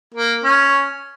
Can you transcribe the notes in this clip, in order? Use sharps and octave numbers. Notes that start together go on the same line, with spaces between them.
A#3
C#4